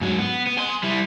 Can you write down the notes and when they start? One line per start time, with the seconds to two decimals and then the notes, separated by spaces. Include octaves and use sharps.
0.01 G#2 F#3
0.19 B3
0.47 B3
0.59 G#5 C6
0.84 G3 E4